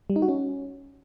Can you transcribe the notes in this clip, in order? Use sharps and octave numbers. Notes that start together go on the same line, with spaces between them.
G3
D#4
F#4
C#4